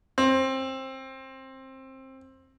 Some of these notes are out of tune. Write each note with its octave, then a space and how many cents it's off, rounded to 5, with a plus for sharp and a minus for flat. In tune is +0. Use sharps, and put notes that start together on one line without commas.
C4 +20